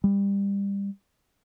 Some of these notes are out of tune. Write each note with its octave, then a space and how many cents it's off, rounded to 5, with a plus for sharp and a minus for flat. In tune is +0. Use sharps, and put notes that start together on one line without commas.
G3 +25